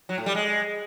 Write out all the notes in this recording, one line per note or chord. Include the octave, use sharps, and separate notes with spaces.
F#3
A2
G3
G#3